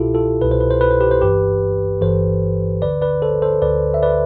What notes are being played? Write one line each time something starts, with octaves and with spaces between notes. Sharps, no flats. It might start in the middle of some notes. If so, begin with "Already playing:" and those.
Already playing: C2 B2 E4 F4 G4 A4
F4 A4
C2 B2 B4
C5
B4
C5
B4
C5
G4 B4
C5
G1 G2 E3 G4 B4
G1 G2 E3 A4 C5
D2 D3 B4 D5
B4 D5
A4 C5
A4 C5
D2 D3 B4 D5
E5
B4 D5